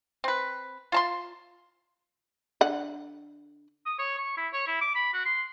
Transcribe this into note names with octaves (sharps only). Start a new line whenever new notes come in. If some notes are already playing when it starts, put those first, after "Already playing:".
C4 B4
F4 A5 C6
D3 F#5
D#6
C#5
C#6
E4
C#5
E4
D6
B5
F#4
C6